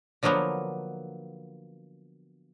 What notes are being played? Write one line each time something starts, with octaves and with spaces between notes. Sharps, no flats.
D3 F3 F#3 A#3 B3